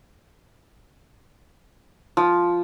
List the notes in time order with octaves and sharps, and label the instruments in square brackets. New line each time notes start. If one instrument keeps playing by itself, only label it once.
[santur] F3